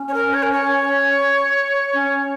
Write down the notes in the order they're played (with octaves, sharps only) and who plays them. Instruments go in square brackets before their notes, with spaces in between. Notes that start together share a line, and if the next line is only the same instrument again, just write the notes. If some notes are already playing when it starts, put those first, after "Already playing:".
Already playing: [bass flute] C#4
[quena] C#5
A#4
C#5
A#4
C#5
[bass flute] C#4